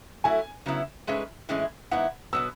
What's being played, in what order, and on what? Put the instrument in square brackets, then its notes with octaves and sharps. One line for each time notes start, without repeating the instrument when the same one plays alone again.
[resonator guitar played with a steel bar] F#3 A3 E4 [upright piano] G#5
[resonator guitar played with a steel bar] C#3 F#3 B3 E4
[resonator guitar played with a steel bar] G#2 G#3 C#4 G#4 B4 [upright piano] E5
[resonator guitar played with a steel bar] A2 E3 G#3 C#4 E4
[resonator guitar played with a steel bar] G#2 E3 B3 E4 [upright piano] F#5
[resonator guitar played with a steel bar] B2 F#3 B3 [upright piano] E6